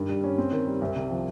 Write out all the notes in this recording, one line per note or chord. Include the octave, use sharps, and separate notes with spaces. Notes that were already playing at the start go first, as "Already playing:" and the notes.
Already playing: G2 D#3
G3
C#4
C4
D#3
G3
C2
C3
F3